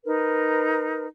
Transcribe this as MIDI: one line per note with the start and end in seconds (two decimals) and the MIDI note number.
0.05 1.06 63
0.05 1.06 70
0.05 1.06 71